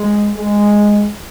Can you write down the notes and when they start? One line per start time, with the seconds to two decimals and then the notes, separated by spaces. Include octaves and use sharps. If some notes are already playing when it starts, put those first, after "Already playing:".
Already playing: G#3
0.36 G#3